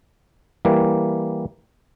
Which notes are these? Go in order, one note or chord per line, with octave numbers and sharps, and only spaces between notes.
E3 G3 A#3